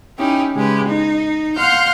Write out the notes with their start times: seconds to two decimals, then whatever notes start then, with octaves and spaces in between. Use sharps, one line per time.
0.19 C#4 D#4 E4 G4
0.56 C#3 G#3 G4 B4
0.86 D#4
1.56 F5 F#5 C6 F6 G6